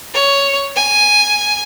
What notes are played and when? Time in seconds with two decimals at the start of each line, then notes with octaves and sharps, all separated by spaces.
0.14 C#5
0.76 G#5